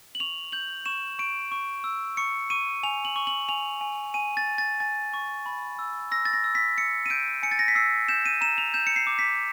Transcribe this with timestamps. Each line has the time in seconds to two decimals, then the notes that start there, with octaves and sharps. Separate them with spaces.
0.15 F#7
0.20 C#6 F7
0.52 G6 F#7
0.86 C#6 E7
1.19 C#6 D7
1.52 C#6
1.84 E6
2.17 C#6 C#7
2.50 C#6 D#7
2.83 G#5 F7
3.05 F#7
3.16 C#6
3.27 F#7
3.49 G#5 F7
3.81 G#5
4.14 G#5 D#7
4.37 A6
4.47 G#5
4.58 A6
4.80 G#5 A6
5.14 C#6
5.46 B5
5.79 E6
6.11 E6 A#6
6.25 A6
6.33 A#6
6.44 E6
6.55 B6
6.77 E6 C#7
7.06 D#7
7.10 G6 D7
7.43 G#5 C#7
7.51 A6
7.59 A#6
7.68 B6
7.75 E6 C7
8.09 G6 E7
8.26 D#7
8.41 A#5 E7
8.58 F7
8.74 G6 E7
8.87 C#7
8.96 C7
9.07 D6
9.19 B6